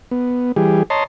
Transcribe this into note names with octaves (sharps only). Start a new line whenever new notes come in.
B3
E3 G3 G4 G#4
C#5 D#5 A5 A#5 C6